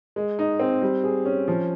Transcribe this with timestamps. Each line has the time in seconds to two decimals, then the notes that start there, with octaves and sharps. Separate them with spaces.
0.16 G#3
0.39 D#4
0.60 C4
0.82 G3
1.04 G#4
1.25 C#4
1.48 F3